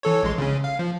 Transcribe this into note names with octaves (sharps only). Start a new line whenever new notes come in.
E3 A4 C#5
A#1 G#3 C6
C#3 C#4
F5
F3